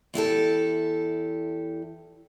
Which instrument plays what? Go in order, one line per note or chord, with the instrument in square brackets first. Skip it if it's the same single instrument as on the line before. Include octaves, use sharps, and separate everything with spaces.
[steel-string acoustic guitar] E2 E4 G4 A4